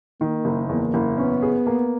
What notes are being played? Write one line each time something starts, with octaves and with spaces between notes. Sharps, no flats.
D#3 A#3
F#1
E2 A#3
F#1
B3 C#4
G#4
A#3